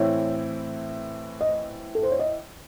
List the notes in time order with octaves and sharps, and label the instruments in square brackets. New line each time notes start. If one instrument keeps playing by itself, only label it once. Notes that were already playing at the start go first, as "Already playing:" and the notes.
Already playing: [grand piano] A2 E3 C4 E4 [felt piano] C#5
[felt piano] D#5
A4
C5
C#5
D#5